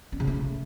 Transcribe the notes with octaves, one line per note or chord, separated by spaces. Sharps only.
C#4
C#3
A3